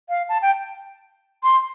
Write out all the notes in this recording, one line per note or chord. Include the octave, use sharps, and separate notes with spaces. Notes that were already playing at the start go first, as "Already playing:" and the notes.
F5
A5
G5
C6